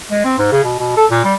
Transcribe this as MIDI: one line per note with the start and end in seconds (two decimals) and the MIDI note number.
0.11 0.20 56
0.24 0.34 60
0.38 0.48 44
0.52 0.63 49
0.63 0.76 47
0.79 0.93 47
0.96 1.06 69
1.11 1.20 46
1.24 1.34 55